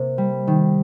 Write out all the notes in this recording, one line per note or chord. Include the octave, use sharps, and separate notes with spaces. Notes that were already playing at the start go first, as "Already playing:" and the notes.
Already playing: C3 A#3
G3
D#3